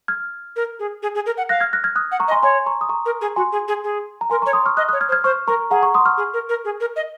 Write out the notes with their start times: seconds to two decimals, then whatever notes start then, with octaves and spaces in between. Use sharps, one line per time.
0.08 F6 G#6
0.56 A#4
0.79 G#4
1.02 G#4
1.15 G#4
1.26 A#4
1.37 F#5
1.49 F5 F#6 A#6
1.60 F6 G#6
1.73 F#6 A#6
1.84 F6 G#6
1.96 D#6 F#6
2.12 F#5
2.20 A#5 C#6
2.28 D#5
2.31 G#5 C6
2.43 C#5 G#5 C6
2.66 A#5 C#6
2.81 D#6
2.89 A#5 C#6
3.06 A#4
3.21 G#4
3.36 F#4 G#5 C6
3.52 G#4
3.68 G#4
3.84 G#4
4.21 A#5
4.30 A#4 G#5 C6
4.42 C#5 A#5 C#6
4.53 C6 D#6
4.66 C#6 F6
4.77 D#5 D#6 F#6
4.89 C#5 D#6 F#6
5.01 F6 G#6
5.09 C5
5.12 F6 G#6
5.24 C5 C#6 F6
5.48 A#4 A#5 C#6
5.70 G#4 F#5 A#5
5.83 A#5 C#6
5.94 C6 D#6
6.06 C#6 F6
6.17 G#4
6.34 A#4
6.49 A#4
6.65 G#4
6.80 A#4
6.96 D#5